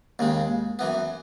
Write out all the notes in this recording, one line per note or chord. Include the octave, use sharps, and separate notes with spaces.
D#2 C#3 G#3
F#2 E3 B3